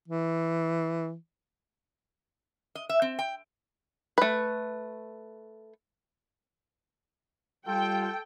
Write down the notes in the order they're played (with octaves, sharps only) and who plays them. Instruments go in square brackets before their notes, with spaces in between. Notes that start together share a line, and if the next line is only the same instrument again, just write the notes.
[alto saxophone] E3
[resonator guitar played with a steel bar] D#5
E5
C4
G5
[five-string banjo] A3 B4
[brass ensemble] G3 F4 [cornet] A4 [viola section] G5